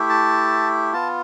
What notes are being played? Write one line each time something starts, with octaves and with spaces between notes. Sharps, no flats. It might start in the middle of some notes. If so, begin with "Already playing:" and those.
Already playing: A3 E4 G4
A5
B3 F4 A5